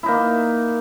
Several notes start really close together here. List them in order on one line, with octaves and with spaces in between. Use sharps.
E4 D#4 A#3